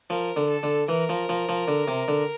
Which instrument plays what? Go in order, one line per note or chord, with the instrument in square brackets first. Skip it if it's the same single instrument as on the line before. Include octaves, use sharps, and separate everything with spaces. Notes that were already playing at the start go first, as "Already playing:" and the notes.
[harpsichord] F3 [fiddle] A#4
[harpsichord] D3
[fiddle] A4
[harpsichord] D3
[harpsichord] E3 [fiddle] A#4
[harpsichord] F3
F3
F3
D3
C3
D3